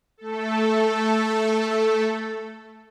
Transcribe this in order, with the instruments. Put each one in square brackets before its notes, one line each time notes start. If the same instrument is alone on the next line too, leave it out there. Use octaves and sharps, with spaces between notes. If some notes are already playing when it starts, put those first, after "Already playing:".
[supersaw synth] A3 A4